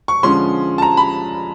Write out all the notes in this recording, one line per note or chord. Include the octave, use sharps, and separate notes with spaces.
C#6
D3 F3 G#3 C#4 C6
A5
A#5
B5